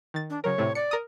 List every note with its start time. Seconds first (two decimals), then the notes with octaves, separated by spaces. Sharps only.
0.14 D#3 A6
0.30 D4
0.44 C#3 F#3 A#4 C#5
0.58 A2 C3 A3
0.75 D5 C#7
0.91 A#4 D#6